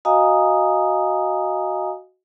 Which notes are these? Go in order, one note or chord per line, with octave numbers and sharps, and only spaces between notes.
F#4 D#5 F5 G#5 A#5 D#6